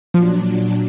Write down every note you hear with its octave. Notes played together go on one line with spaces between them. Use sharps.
A#2 F3 F#3 D4